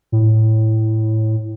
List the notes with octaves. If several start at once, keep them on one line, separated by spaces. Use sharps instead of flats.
A2